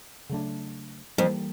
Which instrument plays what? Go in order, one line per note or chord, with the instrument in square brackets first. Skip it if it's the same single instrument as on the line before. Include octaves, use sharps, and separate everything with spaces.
[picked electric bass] C#3 F#3 A3 D4
[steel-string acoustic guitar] F2 [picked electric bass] E3 G3 A#3